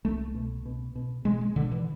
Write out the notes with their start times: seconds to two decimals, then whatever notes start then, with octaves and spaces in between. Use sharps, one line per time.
0.04 C2 A3
0.35 B2
0.66 B2
0.96 B2
1.25 B2 G#3
1.41 G#3
1.56 B2 D3
1.72 E3